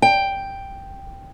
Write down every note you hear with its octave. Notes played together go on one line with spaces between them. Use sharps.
G5